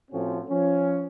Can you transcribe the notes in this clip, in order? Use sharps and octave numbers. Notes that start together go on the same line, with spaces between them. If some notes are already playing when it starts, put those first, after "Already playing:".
A2 F3 A3 C4 C#4 F#4
F3 C#4